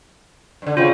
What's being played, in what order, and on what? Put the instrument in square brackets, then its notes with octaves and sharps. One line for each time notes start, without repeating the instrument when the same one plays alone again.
[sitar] G2 D3
[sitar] C#3 C4 [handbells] F4